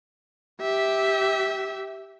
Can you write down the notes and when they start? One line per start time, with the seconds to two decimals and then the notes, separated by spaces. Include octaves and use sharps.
0.62 G4 E5